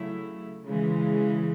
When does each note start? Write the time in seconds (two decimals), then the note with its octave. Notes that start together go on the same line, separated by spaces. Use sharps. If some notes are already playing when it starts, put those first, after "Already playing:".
Already playing: C#3 F#3 A3 E4
0.66 C#3 E3 G#3